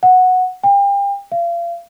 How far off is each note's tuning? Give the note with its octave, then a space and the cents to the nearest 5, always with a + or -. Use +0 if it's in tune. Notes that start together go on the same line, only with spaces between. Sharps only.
F#5 -5
G5 +35
F5 -35